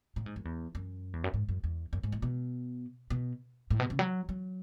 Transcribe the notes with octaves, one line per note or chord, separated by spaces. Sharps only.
A2
G#2
F#2
E2
F#2
E2
F#2
G#2
F#2
E2
F#2
G#2
A2
B2
B2
A2
B2
C#3
F#3
F#3